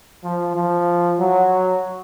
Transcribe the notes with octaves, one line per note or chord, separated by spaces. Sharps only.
F3
F3
F#3